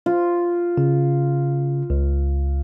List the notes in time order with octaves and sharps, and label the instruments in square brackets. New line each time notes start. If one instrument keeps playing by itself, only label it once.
[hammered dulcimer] F4
[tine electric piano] C#3
C#2